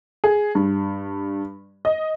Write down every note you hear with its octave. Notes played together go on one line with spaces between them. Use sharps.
G#4
G2
D#5